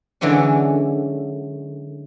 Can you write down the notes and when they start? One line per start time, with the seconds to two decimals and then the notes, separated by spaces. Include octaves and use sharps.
0.21 D3 E3 F#3 G#3 C#4